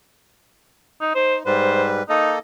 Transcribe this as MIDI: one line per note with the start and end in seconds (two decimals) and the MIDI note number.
1.01 1.13 63
1.15 1.43 63
1.15 1.35 72
1.46 2.03 44
1.46 2.03 55
1.46 2.03 71
1.46 1.89 72
2.09 2.39 58
2.09 2.34 63
2.09 2.39 69
2.09 2.39 75